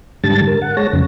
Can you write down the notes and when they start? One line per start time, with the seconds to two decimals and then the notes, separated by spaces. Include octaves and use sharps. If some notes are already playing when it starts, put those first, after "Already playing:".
0.24 G#2 D3 G3 A5 A6
0.47 A#4
0.62 F#5
0.77 G#3 C#5 A5 A#6
0.93 F2 C#3